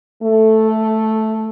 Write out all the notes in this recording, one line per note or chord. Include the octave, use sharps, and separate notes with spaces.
A3